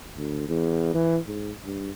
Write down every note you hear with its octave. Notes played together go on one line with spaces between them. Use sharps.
D2
E2
E3
G#2
G2